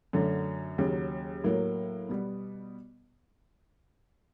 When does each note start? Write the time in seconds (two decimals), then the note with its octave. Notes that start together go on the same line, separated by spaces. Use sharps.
0.13 F#2 D3 F#3 A3
0.78 D#2 C#3 F#3
1.44 A2 F#3 A#3
2.09 B2 G3 B3